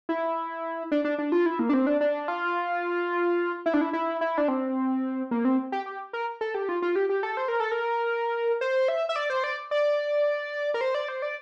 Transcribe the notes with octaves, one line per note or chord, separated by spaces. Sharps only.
E4
D4
D4
D4
F4
E4
A#3
D4
C4
D4
D4
F4
E4
D4
E4
E4
E4
D4
C4
A#3
C4
G4
G4
A#4
A4
G4
F4
F4
G4
G4
A4
C5
A#4
A4
A#4
C5
E5
E5
D5
C5
D5
D5
A#4
C5
D5
C5
D5